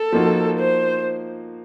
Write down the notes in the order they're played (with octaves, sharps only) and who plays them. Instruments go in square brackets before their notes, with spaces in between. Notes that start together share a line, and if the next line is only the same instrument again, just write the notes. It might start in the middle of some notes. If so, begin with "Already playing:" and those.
Already playing: [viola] A4
[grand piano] F3 A#3 D#4 F#4
[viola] C5